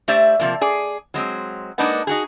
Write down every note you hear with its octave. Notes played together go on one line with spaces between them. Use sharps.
A3 G4 C5 D5 E5
C3 F3 A#3
G#4 D5
F#3 G#3 C4
G#3 A#3 D4 D#4 B4 F#5
D#4 F#4 G#4